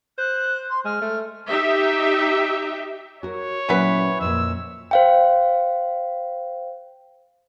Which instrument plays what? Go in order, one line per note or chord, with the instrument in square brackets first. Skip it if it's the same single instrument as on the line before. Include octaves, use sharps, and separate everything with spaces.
[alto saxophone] C5 [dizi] F#6
[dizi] C6
[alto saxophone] G#3 [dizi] F6
[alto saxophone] A3
[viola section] D#4 G4 E5
[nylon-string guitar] F#4 A#4 [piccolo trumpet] C#5
[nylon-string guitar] A#2 F#3 C#4 [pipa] E3 B3 B4
[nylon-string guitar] F2 A#2 [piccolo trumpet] E6
[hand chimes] C5 F5 G5